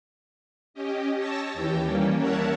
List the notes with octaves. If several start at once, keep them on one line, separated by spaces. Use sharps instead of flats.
C#4 G4 D#5
C#5 A5 E6 A#6
D#2 E3 G4 G5
G3 A#3 C#4
A#4 C#5 E5 F#5 A5